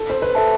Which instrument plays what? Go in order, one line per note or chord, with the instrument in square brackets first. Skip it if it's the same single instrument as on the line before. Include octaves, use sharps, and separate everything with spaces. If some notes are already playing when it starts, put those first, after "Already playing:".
Already playing: [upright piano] A4
C5
B4
[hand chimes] A4 E5 A5